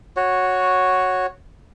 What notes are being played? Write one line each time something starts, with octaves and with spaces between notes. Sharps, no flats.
F#4 C#5